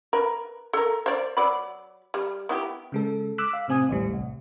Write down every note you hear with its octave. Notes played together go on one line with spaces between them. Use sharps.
A#4 B4
A4 A#4
C5 D5
F#3 D5 B5
G3
B3 E4 G4
C#3 G#3 A4
D6 E6 F#6 B6
F5
A2 C3 C4 G#5 D#6
A1 D#2 A2 G3
C2